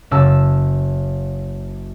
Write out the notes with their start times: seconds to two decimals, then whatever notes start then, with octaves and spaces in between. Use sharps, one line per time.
0.11 F#1 A5 E6